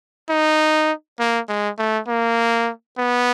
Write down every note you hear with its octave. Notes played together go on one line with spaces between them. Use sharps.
D#4
A#3
G#3
A3
A#3
B3